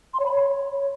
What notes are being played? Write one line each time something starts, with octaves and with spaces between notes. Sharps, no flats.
C6
C#5
B5
C#5